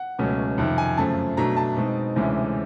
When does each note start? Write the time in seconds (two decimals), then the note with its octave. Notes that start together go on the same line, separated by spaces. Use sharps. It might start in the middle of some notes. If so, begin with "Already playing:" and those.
Already playing: F#5
0.19 C#2 B2 F#3 A3 C#4
0.58 F2 C3 D#3
0.78 G#5
0.98 F#2 C#3 F3 A3 A5
1.37 B2 F#3 A3 D4 A#5
1.57 A5
1.77 B2 G#3 C4 D#4
2.16 D2 C3 E3 G#3 C#4